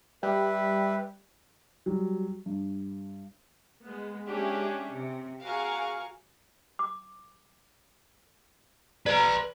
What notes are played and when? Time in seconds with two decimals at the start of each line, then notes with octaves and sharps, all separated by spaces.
0.23 G3 B4 E5
1.86 F#3 G3
2.46 G2
3.84 G#3 B3
4.27 G#3 C#4 D4 G4 G#4 E5
4.90 C3
5.44 F#4 G#4 A#4 F5 C#6
6.79 D6
9.06 B4 D5 A#5